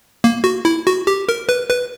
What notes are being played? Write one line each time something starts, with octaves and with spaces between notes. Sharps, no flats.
A#3
F#4
E4
F#4
G4
A#4
B4
B4